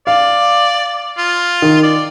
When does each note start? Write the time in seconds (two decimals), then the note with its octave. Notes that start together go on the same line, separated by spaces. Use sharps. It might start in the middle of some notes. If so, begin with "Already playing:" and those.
0.07 D5 F5
1.18 F4
1.62 D#3
1.83 D5